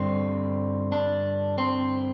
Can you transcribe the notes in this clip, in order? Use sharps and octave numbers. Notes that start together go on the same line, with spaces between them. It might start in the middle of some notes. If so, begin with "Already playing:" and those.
Already playing: G2 D3 G3 C4
D4
C4